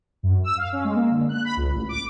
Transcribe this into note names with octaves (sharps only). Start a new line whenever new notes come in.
F#2
E6
F5
C#4
G#3
A#3
D3
F#6
B5
C#2
A1
D6